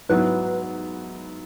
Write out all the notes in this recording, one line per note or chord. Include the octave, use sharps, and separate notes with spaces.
G#2 F#3 B3 E4 B4